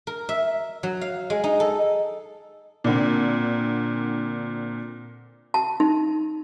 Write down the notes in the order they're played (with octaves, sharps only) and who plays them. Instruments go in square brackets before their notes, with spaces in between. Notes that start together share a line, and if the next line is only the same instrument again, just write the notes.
[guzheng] A#4
E5
F#3
F5
G#3
D#4
A4
[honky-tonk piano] A#2 D3 C4
[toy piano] A5
D#4